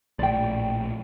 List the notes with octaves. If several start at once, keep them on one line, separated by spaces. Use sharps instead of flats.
A#1 A2 D5 G5